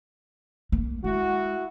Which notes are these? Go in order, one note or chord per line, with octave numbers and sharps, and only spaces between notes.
A#3
G#3 E4 F#4